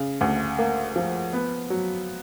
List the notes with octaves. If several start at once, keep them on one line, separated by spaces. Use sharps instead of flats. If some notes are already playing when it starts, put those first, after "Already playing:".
Already playing: C#3
D2
A#3
F3
B3
F#3